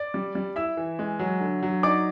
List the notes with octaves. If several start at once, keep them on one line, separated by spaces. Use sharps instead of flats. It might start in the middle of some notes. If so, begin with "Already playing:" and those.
Already playing: D5 D6
G3
G3
E4 E5 E6
E3
G#3
F#3
D3
F#3
D#4 D5 D6